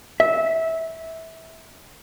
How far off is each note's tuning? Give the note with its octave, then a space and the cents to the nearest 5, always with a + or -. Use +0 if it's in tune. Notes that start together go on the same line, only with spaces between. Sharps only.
E5 -20